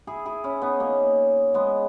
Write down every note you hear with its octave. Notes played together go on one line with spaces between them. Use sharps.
E4 G#4
E4 G#4
C#4 E4
B3 D#4
A#3 C#4
G#3 B3